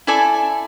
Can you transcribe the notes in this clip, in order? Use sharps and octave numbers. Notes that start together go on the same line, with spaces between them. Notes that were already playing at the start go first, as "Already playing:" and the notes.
E4 A4 D5 G#5